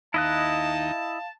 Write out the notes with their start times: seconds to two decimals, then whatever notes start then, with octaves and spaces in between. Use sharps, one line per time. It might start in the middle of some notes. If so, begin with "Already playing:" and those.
0.14 D#2 D#4 E4 D#5 F5 A5 F#6